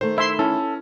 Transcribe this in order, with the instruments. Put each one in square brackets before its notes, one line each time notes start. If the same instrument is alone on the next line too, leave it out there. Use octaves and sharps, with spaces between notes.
[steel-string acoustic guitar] D#3 A3 [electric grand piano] C5
[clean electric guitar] E4 [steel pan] E5 C6
[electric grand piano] C#4 [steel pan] E4 [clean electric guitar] A4